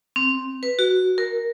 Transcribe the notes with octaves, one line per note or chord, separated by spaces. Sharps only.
C4
B4
F#4
A#4